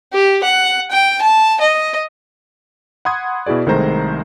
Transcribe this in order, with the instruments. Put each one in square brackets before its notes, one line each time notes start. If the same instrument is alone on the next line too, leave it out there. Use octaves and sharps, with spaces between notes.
[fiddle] G4
F#5
G5
A5
D#5
[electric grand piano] F#5 B5 C6 D#6 G#6
B2 E4 F#4 G#4 D5
C2 D#3 G#3 A3 C5 A#5